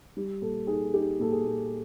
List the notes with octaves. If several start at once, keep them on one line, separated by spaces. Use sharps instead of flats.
G3
A#2 A4
D#4 G#4
D#4 G4
A#2 A4
G#4
A#2